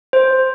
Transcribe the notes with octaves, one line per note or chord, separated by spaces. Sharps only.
C5